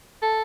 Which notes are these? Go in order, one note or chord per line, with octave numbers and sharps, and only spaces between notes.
A4